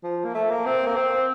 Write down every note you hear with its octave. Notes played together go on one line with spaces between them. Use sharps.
F3
A#3
A3
A#3
C4
A#3
C4